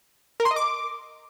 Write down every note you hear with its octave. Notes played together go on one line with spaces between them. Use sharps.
A#4
C6
D#5
D6